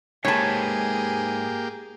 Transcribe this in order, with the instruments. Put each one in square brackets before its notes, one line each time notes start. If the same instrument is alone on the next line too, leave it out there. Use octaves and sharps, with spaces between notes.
[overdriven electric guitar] G#2 B4 [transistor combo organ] A#3 G4 [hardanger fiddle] G#4 [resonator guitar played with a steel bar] C#5 A5